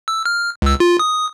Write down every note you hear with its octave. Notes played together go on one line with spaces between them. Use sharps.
E6
F6
C#2 E6
F4
D#6